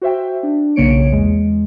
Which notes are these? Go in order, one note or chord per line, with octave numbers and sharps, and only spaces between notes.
F#4 C5 E5 G5
D4
B1 C#3 A#3 C#5 C#7 D7
E2 G#3